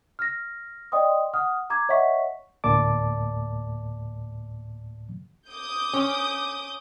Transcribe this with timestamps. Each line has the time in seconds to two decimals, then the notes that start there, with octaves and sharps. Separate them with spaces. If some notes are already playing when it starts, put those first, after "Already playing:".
0.19 F6 A#6
0.92 D5 D#5 G5 C6 D#6
1.33 F#5 D#6 F6
1.70 A#5 D6 G#6
1.89 C#5 D#5 E5 F#5 C#6 B6
2.64 D2 A2 A#3 D5 A5 D6
5.49 D6 D#6 G6
5.93 C#4